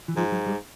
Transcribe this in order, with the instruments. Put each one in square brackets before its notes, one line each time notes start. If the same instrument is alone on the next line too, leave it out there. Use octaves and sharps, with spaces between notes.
[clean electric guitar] E3
[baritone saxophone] G#2 [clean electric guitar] F3
[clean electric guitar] F#3
G3